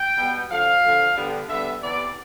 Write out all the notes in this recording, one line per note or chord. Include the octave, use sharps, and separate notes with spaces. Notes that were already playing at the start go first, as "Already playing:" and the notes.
Already playing: G5
B2 G3 B3
D3 F3 A3 F5
D3 F3 A3
D3 G3 B3
D3 G3 B3 E5
C3 E3 B3 D5